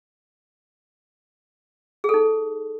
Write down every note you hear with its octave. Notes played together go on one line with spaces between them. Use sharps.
D#4 G#4 A4